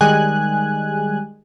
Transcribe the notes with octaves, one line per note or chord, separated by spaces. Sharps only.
D#3 G3 G#3 G#5 F#6